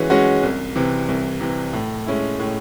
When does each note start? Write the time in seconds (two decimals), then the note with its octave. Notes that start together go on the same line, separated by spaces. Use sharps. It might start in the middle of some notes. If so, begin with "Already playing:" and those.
Already playing: E3 G#3 C#4 F#4
0.10 G#3 C#4 F#4
0.43 C2
0.75 C3 E3
1.08 C2
1.41 C3 E3
1.73 A2
2.07 G#3 C#4 E4
2.40 A2